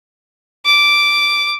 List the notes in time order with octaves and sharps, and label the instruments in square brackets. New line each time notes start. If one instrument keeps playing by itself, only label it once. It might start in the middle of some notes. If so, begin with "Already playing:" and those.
[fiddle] D6